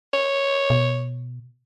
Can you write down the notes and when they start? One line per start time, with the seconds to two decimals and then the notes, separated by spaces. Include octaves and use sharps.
0.14 C#5
0.70 B2